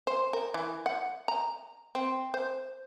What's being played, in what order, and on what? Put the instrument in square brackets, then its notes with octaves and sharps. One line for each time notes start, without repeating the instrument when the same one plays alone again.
[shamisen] C5
A#4
E3
F#5
A#5
C4
C5